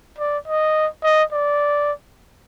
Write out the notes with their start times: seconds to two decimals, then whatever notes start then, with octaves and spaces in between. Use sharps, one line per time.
0.18 D5
0.48 D#5
1.03 D#5
1.32 D5